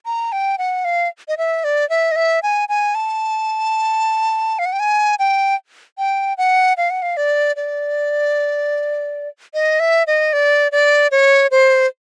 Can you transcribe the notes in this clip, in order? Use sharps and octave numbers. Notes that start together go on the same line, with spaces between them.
A#5
G5
F#5
F5
D#5
E5
D5
E5
D#5
E5
G#5
G#5
A5
F5
F#5
G5
G#5
G5
G5
F#5
F5
F#5
F5
D5
D5
D#5
E5
D#5
D5
D5
C#5
C5